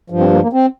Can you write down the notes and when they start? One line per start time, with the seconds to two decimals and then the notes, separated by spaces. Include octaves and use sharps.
0.10 G2 F3
0.20 C4
0.31 A#3
0.43 A#3
0.53 C4